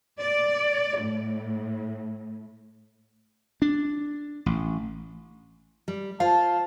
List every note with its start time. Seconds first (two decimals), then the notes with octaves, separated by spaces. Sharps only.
0.19 D5
1.01 A2
3.62 D4
4.46 A1
5.88 G3
6.20 F4 C5 F5 A5